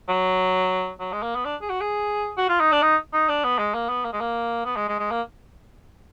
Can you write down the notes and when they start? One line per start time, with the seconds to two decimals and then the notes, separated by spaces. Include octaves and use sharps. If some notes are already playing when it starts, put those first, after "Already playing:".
0.09 F#3
1.00 F#3
1.12 G#3
1.23 A#3
1.35 B3
1.45 D4
1.62 G#4
1.70 F#4
1.81 G#4
2.38 F#4
2.49 F4
2.60 D#4
2.72 D4
2.83 D#4
3.13 D#4
3.29 D4
3.44 B3
3.59 G#3
3.74 A#3
3.89 B3
4.05 A#3
4.13 G#3
4.21 A#3
4.65 B3
4.77 G#3
4.89 G#3
4.99 G#3
5.11 A#3